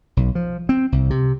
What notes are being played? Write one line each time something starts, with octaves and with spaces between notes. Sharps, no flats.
B1
F3
C4
C2
C3